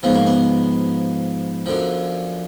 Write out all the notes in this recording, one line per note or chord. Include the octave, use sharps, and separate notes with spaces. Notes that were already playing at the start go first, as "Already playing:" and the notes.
G#2 F3 B3
A#3
B3
F#2 D3 F3